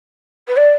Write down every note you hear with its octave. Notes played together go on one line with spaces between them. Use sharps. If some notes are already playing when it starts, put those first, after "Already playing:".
B4
D5